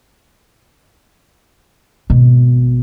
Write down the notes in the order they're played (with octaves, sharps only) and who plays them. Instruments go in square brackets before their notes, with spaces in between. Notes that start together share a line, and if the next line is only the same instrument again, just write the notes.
[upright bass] G#1 B2